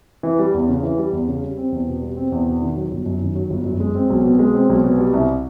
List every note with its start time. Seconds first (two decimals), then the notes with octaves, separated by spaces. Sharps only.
0.23 E3
0.39 G3
0.54 E2
0.68 C#3
0.83 E3
0.98 G3
1.13 E2
1.28 C#3
1.43 G3
1.57 C4
1.72 E2
1.87 B2
2.02 G3
2.17 C4
2.32 E2
2.46 B2
2.61 D#3
2.76 F#3
2.91 G1
3.06 F#2
3.21 D#3
3.35 F#3
3.50 G1
3.65 F#2
3.80 G#3
3.95 C4
4.10 B1
4.24 B2
4.39 G#3
4.54 C4
4.69 B1
4.84 B2
4.99 G3
5.13 C2